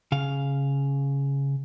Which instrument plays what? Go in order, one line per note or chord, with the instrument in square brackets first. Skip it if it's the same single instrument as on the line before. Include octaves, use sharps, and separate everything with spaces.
[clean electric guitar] C#3 F5